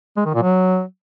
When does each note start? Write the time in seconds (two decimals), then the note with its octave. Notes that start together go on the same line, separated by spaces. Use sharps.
0.17 G#3
0.26 D#3
0.34 A#2
0.43 F#3